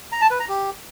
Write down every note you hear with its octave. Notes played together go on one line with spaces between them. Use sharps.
A#5
A5
B4
A#5
G4